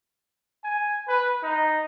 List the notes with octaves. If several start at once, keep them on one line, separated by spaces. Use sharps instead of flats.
G#5
B4
D#4